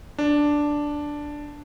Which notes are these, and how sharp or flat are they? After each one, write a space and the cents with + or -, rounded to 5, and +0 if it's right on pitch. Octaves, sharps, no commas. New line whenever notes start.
D4 +0